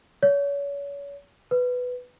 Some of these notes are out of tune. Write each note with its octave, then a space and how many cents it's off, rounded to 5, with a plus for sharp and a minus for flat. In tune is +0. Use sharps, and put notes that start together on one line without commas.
C#5 +35
B4 +10